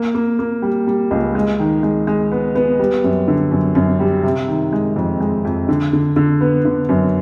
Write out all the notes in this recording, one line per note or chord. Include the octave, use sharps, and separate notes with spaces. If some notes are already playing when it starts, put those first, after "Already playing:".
Already playing: A#3
A#3
A#3
G3
G3
C#2
G#3
D#3
G#3
G#3
B3
B3
G3
F#2
D3
F#2
F#2
G3
C3
D#3
G#3
F2
G#3
F2
D3
D3
D3
B3
D3
F#2